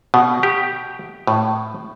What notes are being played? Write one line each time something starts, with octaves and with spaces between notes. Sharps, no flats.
B2
G4
A2